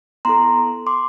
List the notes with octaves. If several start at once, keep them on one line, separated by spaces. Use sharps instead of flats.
B3 E4 A4 A#5 C6
C6 D6